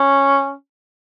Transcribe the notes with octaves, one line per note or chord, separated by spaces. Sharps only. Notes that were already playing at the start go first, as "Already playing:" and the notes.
Already playing: C#4